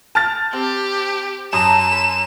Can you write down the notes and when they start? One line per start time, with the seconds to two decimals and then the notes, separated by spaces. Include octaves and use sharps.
0.15 G5 A5 F6 A6
0.53 C4 G4
1.53 F#2 A5 A#5 D#6 E7
1.92 B5